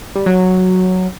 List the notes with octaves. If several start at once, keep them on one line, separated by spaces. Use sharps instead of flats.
G3
F#3